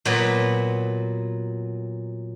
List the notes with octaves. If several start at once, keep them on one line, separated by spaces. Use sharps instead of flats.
A#2 F#3 B3